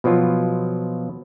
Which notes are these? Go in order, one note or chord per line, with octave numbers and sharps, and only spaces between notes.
B2 F3 F#3 F4